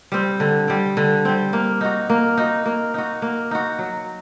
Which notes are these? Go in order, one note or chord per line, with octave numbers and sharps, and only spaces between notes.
G3 C4
D3
G3 C4
D3
G3 C4
A#3
D#4 F#4
A#3
D#4 F#4
A#3
D#4 F#4
A#3
D#4 F#4
F#3